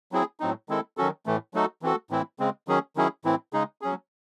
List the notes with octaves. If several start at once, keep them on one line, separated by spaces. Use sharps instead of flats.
F#3 C4 E4 G#4
A2 F#3 C4 D#4
D#3 G#3 C4 E4 A4
D#3 F#3 C#4 F#4 A4
A2 E3 A3
F#3 A3 D#4 F#4 A4
E3 C4 F#4 A4
A2 E3 C4 E4
C#3 G#3 C4
D#3 F#3 C#4 G#4
D#3 F#3 C#4 E4 G#4
A2 E3 C4 E4
C#3 G#3 D#4 G#4
F#3 C#4 G#4